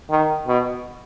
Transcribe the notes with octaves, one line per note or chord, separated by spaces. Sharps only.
D#3
B2